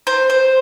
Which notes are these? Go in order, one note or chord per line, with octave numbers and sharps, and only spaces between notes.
C5
C5